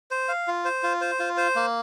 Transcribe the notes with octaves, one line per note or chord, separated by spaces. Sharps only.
C5
F5
F4
C5
F4
C5
F4
C5
A#3